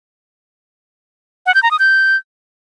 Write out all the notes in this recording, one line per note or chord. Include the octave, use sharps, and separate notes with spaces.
F#5
G6
A#5
D#6
G6